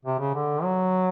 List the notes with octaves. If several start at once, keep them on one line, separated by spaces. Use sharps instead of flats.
C3
C#3
D3
F#3